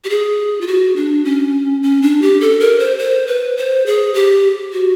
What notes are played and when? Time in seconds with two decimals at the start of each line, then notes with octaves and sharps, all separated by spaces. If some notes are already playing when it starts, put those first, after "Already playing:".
0.04 G4
0.09 G#4
0.61 F4
0.67 F#4
0.96 D4
1.25 C#4
1.83 C#4
2.02 D4
2.22 G4
2.41 A4
2.60 A#4
2.79 C5
2.98 C5
3.27 B4
3.57 C5
3.86 G#4
4.14 G4
4.73 F#4